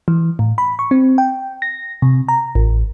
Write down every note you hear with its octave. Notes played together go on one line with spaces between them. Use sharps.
E3
A2
B5
C#6
C4
G5
A#6
C3
A#5
A1